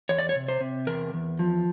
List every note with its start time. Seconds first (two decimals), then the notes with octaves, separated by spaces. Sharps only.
0.09 E2 C#5
0.19 D5
0.29 C#5
0.36 C3
0.48 C5
0.61 C3
0.87 E2 A#4
1.14 E2
1.39 F3